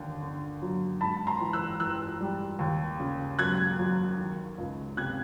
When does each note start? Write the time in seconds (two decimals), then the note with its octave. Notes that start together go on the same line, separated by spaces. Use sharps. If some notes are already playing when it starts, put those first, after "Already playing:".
Already playing: D#2 D3
0.22 D3
0.62 F#3
1.01 G#2 A5 B5
1.27 A#5 C6
1.41 E3
1.53 E6 F#6
1.80 E3 E6 F#6
2.21 G3
2.59 D#2
3.00 C#3
3.39 F#3 F#6 G#6
3.79 F#3
4.18 D#3
4.58 C#2
4.97 C3 F#6 G#6